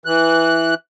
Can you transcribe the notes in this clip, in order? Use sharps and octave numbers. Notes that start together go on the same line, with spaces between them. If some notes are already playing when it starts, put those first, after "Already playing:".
E3 F#6